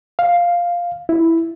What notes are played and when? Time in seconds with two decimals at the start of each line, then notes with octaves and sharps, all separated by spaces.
0.19 F5
1.09 E4